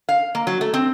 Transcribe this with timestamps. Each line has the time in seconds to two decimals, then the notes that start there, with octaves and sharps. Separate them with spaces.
0.09 F5
0.35 A#3
0.47 F#3
0.61 A3
0.74 C4